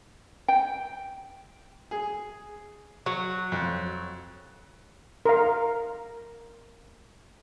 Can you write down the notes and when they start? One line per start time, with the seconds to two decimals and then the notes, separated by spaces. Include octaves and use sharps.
0.48 G5
1.91 G#4
3.06 F#3
3.52 F2
5.25 A#4 F5